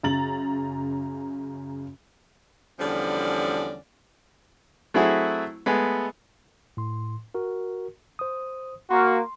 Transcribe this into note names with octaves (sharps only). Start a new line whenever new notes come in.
F#2 C#3 A#5 A6 F#7
E2 D3 F3 G3 C#4 D5
F#3 A3 C4 E4 F#4 G#4
G#3 A3 B3
A2 C6
F#4 A#4
C5 D#6
A#3 F#4 C6